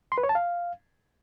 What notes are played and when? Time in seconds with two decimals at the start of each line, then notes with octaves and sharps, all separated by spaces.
0.12 C6
0.18 B4
0.23 C#5
0.29 A5
0.35 F5